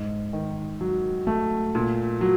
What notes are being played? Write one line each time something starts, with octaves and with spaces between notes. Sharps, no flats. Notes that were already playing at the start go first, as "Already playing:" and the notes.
Already playing: G#2
D#3
F#3
A3
A#2
F#3